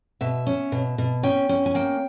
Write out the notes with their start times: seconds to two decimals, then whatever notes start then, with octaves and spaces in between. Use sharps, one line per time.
0.21 B2 E5
0.47 C#4
0.72 B2
0.98 B2
1.23 C#4 G5
1.49 C#4
1.66 G#5
1.75 A#3 G5